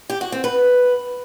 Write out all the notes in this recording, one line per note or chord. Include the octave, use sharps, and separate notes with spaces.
G4
F#4
C4
B4